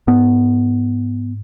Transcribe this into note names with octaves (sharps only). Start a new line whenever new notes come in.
G#2 B3